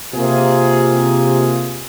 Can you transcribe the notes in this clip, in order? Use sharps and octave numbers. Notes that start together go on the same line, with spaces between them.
C3 A#3 F4 G#4